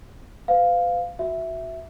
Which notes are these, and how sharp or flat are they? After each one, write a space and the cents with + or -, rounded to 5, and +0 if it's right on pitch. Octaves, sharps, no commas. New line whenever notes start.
B4 +40 F5 +0
F#4 +0 E5 +0